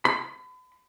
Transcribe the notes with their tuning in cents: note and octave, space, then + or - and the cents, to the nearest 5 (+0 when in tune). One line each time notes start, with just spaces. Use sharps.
B5 +40